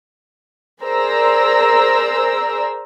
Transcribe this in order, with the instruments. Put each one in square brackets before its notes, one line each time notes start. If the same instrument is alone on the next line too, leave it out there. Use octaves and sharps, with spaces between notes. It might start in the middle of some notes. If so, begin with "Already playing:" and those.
[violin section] G#4 A#4 C5 D5 A#5 E6